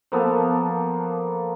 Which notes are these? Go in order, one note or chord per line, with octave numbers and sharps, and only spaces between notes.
F3 A#3 B3 A4